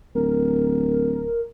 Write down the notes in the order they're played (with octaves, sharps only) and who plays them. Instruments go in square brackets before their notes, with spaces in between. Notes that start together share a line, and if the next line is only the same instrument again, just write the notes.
[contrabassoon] D1 [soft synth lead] A#4